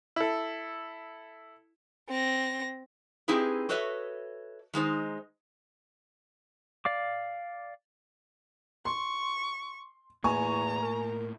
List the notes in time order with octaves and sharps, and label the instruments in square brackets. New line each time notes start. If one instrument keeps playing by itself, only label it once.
[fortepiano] E4 A4
[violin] C4 A#6
[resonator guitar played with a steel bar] C4 D#4 E4 G4 G#4 B4
F#4 A4 B4 C#5 D#5 E5
D#3 G#3 D#4 C5
[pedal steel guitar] D5 F5 D6
[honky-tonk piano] C6 [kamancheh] C#6
[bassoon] E2 [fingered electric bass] A2 A#3 [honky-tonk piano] G#5 C#6 [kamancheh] A#5
[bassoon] A#4